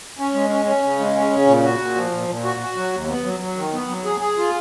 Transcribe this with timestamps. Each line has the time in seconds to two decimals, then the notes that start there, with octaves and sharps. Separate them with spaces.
0.18 C#4
0.34 G#3
0.50 C#4
0.66 C#4
0.83 C#3
0.99 G#3
1.15 C#4
1.31 C#3
1.46 A#2
1.64 F#4
1.79 A#2
1.95 F3
2.11 A#2
2.28 A#2
2.44 F#4
2.60 F#4
2.76 F#3
2.93 D#2
3.08 B3
3.25 F#3
3.40 F#3
3.56 D#3
3.73 B3
3.89 F#3
4.05 G#4
4.21 G#4
4.38 F4